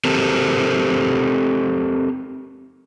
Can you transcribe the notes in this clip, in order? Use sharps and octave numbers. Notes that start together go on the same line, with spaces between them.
C4 G4 A4 A#4 C5